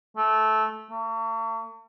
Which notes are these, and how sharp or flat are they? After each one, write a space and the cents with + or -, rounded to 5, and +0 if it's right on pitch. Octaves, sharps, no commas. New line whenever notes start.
A3 -15
A3 +45